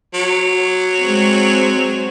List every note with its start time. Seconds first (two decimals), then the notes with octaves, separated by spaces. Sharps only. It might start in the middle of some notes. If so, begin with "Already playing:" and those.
0.14 F#3
1.03 G#3 C4